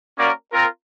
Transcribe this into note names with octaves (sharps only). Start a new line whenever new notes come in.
A#3 C#4 F#4 A#4 D5
C4 F4 A#4